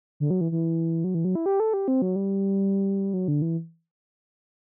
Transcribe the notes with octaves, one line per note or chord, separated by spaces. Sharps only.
D3
F#3
E3
E3
F#3
E3
F#3
E4
G4
A4
G4
C4
F#3
G3
F#3
D3
E3